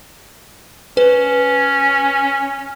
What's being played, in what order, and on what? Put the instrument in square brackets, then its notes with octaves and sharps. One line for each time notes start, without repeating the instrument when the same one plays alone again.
[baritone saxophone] C#4 [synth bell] B4